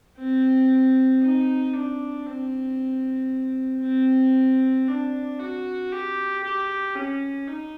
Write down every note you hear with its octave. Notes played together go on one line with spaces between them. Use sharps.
C4
D#4
D4
C4
C4
D4
F#4
G4
G4
C#4
D#4